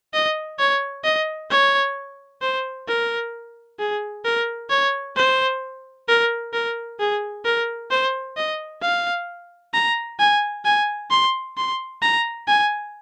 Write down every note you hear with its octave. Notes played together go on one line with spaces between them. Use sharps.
D#5
C#5
D#5
C#5
C5
A#4
G#4
A#4
C#5
C5
A#4
A#4
G#4
A#4
C5
D#5
F5
A#5
G#5
G#5
C6
C6
A#5
G#5